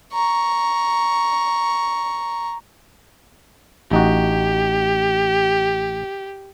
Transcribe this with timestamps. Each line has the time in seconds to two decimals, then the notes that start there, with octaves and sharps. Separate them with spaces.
0.13 A#5 C#6
3.91 A1 D#4 F#4 G4